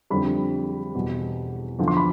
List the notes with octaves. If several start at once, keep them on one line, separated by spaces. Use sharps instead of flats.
F2 D3 G3 B5
E2 B2 G3
E2 D3 F3
C6
B5